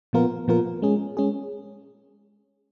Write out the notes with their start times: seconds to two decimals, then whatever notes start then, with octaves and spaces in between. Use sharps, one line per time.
0.13 A#2 F3 B3 F4 A#4
0.48 A#2 F3 B3 F4 A#4
0.82 G#3 C#4 G#4
1.17 G#3 C#4 G#4